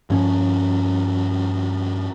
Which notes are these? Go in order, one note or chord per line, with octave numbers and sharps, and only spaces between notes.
G2 F3 C#4